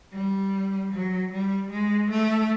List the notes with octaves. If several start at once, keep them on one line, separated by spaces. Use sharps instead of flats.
G3
F#3
G3
G#3
A3